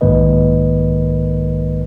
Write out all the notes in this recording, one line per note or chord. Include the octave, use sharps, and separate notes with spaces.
B1 G#2 D#3 A#3 B4 D#5